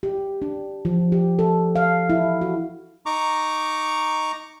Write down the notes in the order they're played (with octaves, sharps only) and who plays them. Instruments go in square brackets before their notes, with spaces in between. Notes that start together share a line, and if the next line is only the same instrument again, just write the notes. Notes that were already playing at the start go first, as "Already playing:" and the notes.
[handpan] G4
D4
F3
G4
A4
F5
E4
F#4
[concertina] D#4 A#5 C#6 D6